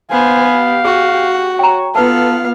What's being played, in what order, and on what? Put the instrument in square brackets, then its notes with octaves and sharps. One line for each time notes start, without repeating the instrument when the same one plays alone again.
[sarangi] B3 [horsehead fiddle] C5 G#5 [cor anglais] F5
[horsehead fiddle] G4
[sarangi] F#4 [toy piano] G#4
[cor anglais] C#5 [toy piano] G5 A#5
[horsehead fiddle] B3 F4 [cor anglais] A4 [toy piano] B4 A5 [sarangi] F5